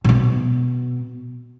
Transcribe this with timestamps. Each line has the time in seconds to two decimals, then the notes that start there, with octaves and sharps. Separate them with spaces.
0.04 B2 B3